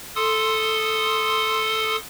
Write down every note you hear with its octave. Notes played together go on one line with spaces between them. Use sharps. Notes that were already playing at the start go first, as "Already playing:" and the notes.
A4 C6 D#6